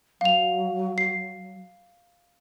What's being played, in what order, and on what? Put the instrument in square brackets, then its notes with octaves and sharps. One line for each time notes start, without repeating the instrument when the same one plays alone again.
[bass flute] F#3 [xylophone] F5 F7
[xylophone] C7